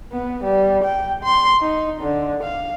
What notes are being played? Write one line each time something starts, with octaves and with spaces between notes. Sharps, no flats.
B3
G3
G5
C6
D#4
D3
F5